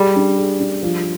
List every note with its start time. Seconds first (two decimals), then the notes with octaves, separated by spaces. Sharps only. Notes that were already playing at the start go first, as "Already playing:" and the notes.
Already playing: G3 G#4
0.16 D4
0.38 G#4
0.60 D4
0.83 F3